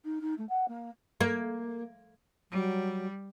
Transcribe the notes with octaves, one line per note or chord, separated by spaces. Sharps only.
D#4
D#4
A3
F#5
A#3
A#3
F#3 G3